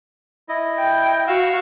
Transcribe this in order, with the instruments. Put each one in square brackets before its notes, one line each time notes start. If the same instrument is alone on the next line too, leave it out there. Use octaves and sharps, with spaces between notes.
[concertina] E4 D#5
[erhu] G5
[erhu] F#4 [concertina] F5 E6